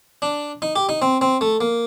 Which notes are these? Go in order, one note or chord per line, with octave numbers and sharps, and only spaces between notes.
D4
D#4
G4
D#4
C4
C4
A3
A#3